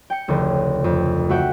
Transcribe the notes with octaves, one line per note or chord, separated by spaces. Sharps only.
G5 C#7
F1 D2 C#3
F2
A3 F#4 E5 F#5 G5